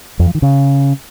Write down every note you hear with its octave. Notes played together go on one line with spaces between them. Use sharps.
F2
F3
D#3
C#3